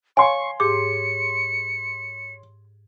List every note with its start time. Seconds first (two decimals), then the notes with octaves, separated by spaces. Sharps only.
0.17 C#5 F5 G#5 C6 C#6
0.60 G#2 G4 G#4 D6 C#7